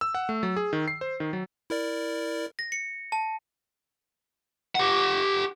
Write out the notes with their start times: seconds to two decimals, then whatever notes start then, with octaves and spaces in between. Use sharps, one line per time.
0.01 E6
0.15 F#5
0.29 A3
0.43 F#3
0.56 G#4
0.73 D#3
0.88 C7
1.01 C5
1.20 D#3
1.33 F#3
1.70 E4 A#4 D5
2.59 A#6
2.72 C#7
3.12 A5
4.75 G4 F#5